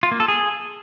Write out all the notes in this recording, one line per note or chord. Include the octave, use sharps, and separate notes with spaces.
F4
A#3
A4
G#4